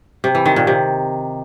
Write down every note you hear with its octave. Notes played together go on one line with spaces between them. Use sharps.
C3
E3
D#3
A#2
C3